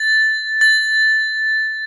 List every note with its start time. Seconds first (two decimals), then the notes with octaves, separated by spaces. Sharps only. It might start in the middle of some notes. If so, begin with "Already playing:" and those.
Already playing: A6
0.61 A6